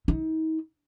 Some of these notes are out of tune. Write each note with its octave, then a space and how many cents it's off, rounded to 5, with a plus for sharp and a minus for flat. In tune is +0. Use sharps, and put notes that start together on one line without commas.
D#4 +40